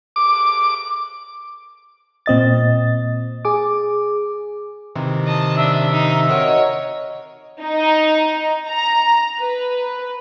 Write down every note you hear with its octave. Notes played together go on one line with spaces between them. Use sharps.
D6
A#2 C4 D#5 A6
G#4 D6
C3 D#3 E3
D#5 A5
D4 E5
D#4
F#4 A#4 C#5 D#5
D#4
A#5
B4